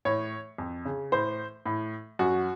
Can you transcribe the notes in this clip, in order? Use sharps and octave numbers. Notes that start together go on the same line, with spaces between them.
A2 C#5
F2
C#3
A2 C5
A2
F#2 F#4